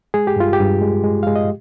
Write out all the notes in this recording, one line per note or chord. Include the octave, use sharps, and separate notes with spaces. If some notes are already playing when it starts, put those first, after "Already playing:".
G#3 G#4
G4
G2 F4
G4
G2
G#3
G#3
G#3 F5
D#5